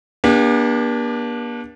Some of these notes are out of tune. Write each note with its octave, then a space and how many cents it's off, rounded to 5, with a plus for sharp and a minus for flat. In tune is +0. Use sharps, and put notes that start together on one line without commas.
A#3 +45 D4 -5 G4 +35